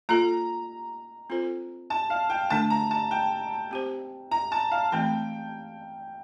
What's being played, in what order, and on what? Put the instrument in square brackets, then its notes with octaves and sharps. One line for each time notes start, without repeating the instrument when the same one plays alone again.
[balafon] A#3 F4 A4 [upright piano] A#5
[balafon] C4 F4 A4 C5
[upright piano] A5
F5
G5
[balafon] D3 A3 D4 [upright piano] A5
[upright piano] A#5
A5
G5
[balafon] C4 G4 C5
[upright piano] A#5
A5
F5
[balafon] E3 A3 C4 [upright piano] G5